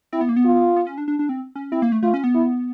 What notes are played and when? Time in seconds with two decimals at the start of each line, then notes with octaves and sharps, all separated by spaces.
0.13 C4 E4
0.21 B3
0.29 A#3
0.36 B3
0.45 F4
0.76 B3
0.87 C#4
0.98 D4
1.08 D4
1.19 D4
1.29 C4
1.55 C#4
1.72 C4 E4
1.82 A#3
1.92 A3
2.03 A3 F4
2.14 C#4
2.24 B3
2.35 E4